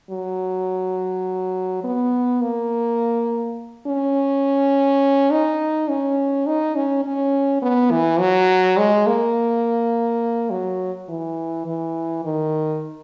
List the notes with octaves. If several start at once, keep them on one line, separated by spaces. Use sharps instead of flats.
F#3
B3
A#3
C#4
D#4
C#4
D#4
C#4
C#4
B3
E3
F#3
G#3
A#3
F#3
E3
E3
D#3